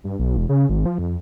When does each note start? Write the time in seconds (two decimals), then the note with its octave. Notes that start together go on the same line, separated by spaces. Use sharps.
0.04 G2
0.19 B1
0.37 E1
0.49 C#3
0.70 G#1
0.86 F3
0.98 F2